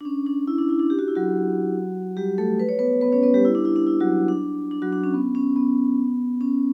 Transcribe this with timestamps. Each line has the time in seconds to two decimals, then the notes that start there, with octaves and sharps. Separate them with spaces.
0.01 D4
0.05 C#4
0.27 D4
0.47 E4
0.58 D4
0.69 E4
0.79 D4
0.90 G4
0.99 F#4
1.08 E4
1.15 F#3 F#4
2.17 G3 G4
2.38 A3 A4
2.60 B4
2.69 C#5
2.79 B3 B4
3.01 B3 B4
3.12 C#4 C#5
3.23 B3 B4
3.34 G3 G4
3.45 E4
3.55 D4
3.65 E4
3.76 D4
3.87 E4
4.00 F#3 F#4
4.28 D4
4.71 D4
4.82 F#3 F#4
4.92 D4
5.04 C#4
5.14 B3
5.35 C#4
5.56 B3
6.41 C#4